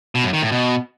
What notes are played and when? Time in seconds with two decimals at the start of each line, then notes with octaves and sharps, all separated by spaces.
0.15 B2
0.24 F#2
0.33 D#3
0.42 A2
0.52 B2